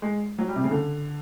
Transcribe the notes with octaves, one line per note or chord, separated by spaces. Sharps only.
G#3
F#3
G3
C3
C#3
D3